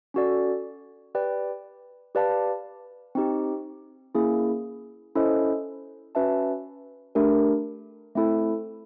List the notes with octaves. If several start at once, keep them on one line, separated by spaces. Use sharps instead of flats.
C#4 F#4 A4 D5
G4 B4 D5 G5
G4 B4 D5 F5 A5
C4 D#4 G4
A#3 C#4 E4 G#4
C#4 E4 A4 C5 D#5
C#4 F#4 B4 E5 A5
A3 D4 G4 A#4
A3 C4 E4 A4